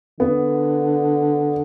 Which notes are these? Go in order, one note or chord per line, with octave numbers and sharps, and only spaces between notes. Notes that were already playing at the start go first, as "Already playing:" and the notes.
D3 B3